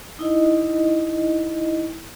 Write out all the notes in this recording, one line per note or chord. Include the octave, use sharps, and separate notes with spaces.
D#4 E4 D#5